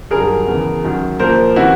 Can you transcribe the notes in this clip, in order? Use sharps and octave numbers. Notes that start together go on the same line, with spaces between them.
G2 D#3 F#3 G#4 A#4
E2 C#3 E3
F#2 D#3 F#3
A#2 F3 A#4 C5
C3 E3 E4 F#4